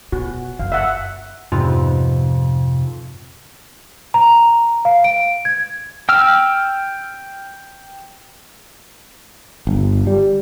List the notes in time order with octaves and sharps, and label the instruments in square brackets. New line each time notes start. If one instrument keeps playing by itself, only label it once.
[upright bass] B2 [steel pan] F#4
[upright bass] F#1 [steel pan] F5
[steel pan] E5 F#5
[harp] F2 G#2 C3 B3 C4 F4
[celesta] A#5
F5
D7
G#6
[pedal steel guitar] G5 E6 F6
[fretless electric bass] G1
G3